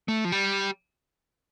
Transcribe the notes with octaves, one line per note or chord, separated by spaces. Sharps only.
A3
F3
G3